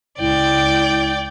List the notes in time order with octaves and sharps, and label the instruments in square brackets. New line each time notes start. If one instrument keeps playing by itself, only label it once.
[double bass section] C#2 [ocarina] E4 [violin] D5 G5